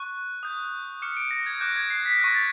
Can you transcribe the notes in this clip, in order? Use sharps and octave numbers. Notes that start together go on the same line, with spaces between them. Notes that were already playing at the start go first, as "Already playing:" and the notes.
Already playing: C#6 F#6
D#6 G6
D6 F6 C#7
D7
A#6
G#6
D6 F#6 G6
G#6
C7
B6
C#6 F#6 A#6
A6